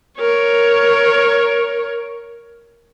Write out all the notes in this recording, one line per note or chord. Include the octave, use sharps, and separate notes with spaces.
A#4 C#5